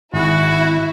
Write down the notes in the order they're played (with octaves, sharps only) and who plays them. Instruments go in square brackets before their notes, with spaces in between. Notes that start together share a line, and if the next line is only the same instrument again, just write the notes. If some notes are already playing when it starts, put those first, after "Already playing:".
[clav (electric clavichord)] G#1 G#4 [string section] E4 [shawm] F#4